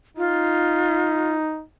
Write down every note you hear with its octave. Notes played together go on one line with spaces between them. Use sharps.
D#4 F4